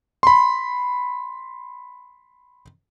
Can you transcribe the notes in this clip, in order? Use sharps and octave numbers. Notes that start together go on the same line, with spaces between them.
B5 C6